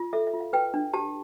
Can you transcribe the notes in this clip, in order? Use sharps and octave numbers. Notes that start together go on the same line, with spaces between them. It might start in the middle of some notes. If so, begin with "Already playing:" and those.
Already playing: F4
A4 E5
E5
F4
F5
B4 G5
D4
G4 A5